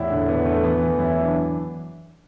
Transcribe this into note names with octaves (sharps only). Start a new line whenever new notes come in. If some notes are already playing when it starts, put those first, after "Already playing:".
Already playing: E2 A2 E4
D3
E2 B3
D3 A3
E3 B3
E3
F#2 E4
E4
E3
D4